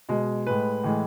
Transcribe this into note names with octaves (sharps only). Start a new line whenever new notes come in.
B2 G#3
A2 G#3 B4
A2 E3 G#3